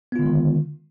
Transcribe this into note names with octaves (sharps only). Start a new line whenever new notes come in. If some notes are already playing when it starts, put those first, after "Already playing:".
D3 D#3 G#3 B3 F4